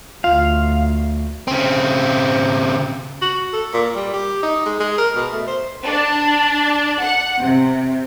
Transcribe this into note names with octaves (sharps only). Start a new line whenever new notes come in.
D2 F4 F5
C#3 C4
F#4
A4
A#2
G3
G4
D#4
G#3
G#3
A#4
B2
A3
C5
D4
F#5
C3